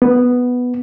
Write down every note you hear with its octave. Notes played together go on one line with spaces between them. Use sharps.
B3